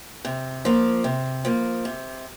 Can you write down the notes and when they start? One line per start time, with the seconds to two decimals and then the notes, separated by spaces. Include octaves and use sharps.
0.25 C3
0.65 F3 A#3
1.04 C3
1.45 F3 A#3
1.85 C3